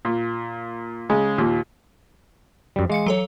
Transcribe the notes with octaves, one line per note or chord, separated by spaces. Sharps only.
A#2
C#3 G#3
D#2 A#2
F#2 G3
E3 G#3 F5 C#7
F#3 A4 C#5